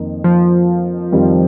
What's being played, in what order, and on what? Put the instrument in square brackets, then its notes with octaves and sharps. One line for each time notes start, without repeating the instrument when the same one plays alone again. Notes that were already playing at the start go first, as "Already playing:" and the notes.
Already playing: [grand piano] F2 D#3 A#3 D#4
[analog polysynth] F3
[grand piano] F2 D#3 G3 C4